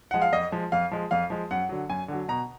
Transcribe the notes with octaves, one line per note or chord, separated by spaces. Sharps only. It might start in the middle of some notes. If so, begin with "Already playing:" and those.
F3 G#3 F#5
F5
F2 D#5
F3 G#3
F2 F5
F3 G#3
F2 F5
F3 G#3
F#2 F#5
D3 F#3
F#2 G#5
D3 F#3
B2 A#5